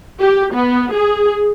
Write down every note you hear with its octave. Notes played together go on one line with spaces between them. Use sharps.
G4
B3
G#4